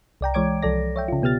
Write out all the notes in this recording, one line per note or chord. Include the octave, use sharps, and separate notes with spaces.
C2 D5 G5 A#5
E3 G#3 C#5 D6 G#6 D7
C2 F3 A4 D5 A#6
C#5 E5 G5
C#3 F4
B2 B3 G4 F6 A6